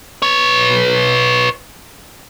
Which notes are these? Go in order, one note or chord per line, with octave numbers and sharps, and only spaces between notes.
B4 C#5